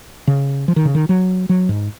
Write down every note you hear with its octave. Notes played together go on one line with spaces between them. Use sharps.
C#3
F3
D#3
C#3
D#3
F#3
F#3
G#2